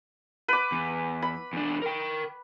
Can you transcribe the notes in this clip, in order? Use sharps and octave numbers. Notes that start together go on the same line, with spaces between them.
B4 D6
E2
B5
E2 D4
A#4 G5